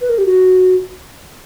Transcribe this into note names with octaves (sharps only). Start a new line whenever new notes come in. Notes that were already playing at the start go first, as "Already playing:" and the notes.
B4
A#4
G4
F#4